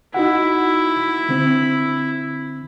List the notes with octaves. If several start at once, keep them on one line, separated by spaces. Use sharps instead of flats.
D#4 E4 F#4 F#5
D3 C4